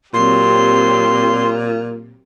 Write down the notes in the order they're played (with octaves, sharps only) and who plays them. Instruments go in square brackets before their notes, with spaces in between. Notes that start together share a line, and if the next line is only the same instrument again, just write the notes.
[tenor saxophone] A#2 [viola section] F#3 C4 G4 [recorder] C6